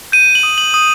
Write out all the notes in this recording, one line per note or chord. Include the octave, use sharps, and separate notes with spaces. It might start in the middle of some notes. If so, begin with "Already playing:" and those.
G6 D#7
F#7
D#6
F#7
D#6